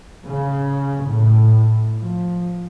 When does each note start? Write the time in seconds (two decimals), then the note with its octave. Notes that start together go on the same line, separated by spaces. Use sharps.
0.26 C#3
1.06 A2
2.01 F3